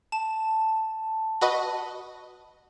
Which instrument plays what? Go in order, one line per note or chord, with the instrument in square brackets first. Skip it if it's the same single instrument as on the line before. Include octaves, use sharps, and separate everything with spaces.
[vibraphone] A5 [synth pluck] E7
[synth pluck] F#4 B4 D#5